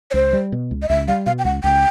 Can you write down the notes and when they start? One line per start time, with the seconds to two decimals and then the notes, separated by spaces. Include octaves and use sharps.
0.11 C#5
0.14 C#2 C5
0.33 G3
0.52 B2
0.71 C#2
0.82 D#5
0.89 C#2 E5
1.08 G3 F5
1.26 B2 F5
1.39 G5
1.45 C#2 F#5
1.64 C#2 G5